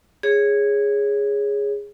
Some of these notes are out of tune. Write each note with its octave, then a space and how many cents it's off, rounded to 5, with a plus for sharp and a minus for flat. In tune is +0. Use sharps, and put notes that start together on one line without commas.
G#4 -10 C#5 +0